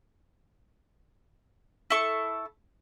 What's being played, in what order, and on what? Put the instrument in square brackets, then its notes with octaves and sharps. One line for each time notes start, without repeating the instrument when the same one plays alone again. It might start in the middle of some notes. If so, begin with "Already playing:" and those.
[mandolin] E4 A4 A5 C#6